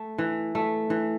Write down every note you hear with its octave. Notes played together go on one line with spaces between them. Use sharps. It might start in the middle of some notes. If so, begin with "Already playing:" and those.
Already playing: A3
E3
A3
E3